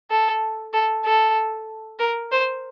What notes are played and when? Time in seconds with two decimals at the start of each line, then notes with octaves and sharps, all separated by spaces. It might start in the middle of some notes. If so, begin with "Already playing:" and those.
0.11 A4
0.73 A4
1.05 A4
1.99 A#4
2.32 C5